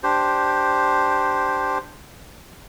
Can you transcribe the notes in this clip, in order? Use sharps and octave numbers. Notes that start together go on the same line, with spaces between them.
D4 G4 C5